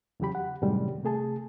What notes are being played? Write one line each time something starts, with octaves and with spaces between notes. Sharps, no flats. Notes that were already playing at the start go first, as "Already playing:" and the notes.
E2 C#3 F#3 G4 B5
F#5
F#2 A2 C3 D#3 G3 G#3
C3 A3 G#4 A5